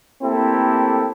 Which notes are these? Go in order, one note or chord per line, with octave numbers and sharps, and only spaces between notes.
A3 A#3 C4 E4 G4 A4